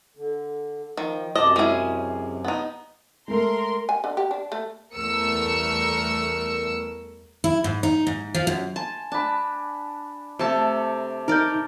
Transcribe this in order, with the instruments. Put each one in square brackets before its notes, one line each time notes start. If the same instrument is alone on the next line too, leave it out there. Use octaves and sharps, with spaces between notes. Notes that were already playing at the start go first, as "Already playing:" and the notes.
[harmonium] D3
[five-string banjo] D#3 [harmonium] F3
[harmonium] F#2 C3 [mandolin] D5 A5 [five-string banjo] D#5
[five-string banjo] G#3 E4 [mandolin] C#4 G#4
[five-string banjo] B3 D#4
[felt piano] G#3 A3 [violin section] A#4 C6
[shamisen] G#5
D3
G4
D4
A3
[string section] E2 G3 A3 A#4 E6 C#7
[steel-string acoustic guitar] E4
G#2
D#4
G#2
F3
F#2
[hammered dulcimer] G#5 C6 [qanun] A5
[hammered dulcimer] D4 B5 [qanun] A5
[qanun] C3 A5 [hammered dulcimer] A3 A4 D6
[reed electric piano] D#4 G6 [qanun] A#4 D5